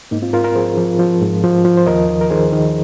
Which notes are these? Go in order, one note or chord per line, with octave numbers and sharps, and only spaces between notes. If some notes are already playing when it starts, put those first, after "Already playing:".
G#2 A#3 D#4
C4 F4
G#2 F4 A#4
F4 A#4
F3 G#4 C5
F3
F3
G#2
F3
F3
C5
D#2 A#4 D#5
D#3
A#4
D#3 G#4 C5
D#3